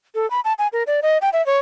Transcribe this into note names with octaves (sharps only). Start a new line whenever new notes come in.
A4
B5
A5
G#5
A#4
D5
D#5
G5
E5
C#5